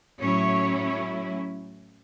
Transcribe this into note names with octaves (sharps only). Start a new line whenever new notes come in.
A2 F#3 C#4 E4 C#5